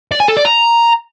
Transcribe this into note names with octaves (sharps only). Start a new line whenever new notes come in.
D5
G#5
A4
D5
A#5